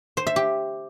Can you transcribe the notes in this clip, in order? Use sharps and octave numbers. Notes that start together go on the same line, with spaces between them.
C5
E5
G4